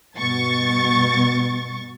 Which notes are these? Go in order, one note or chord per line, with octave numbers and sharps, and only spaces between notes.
G2 B2 C#6 A6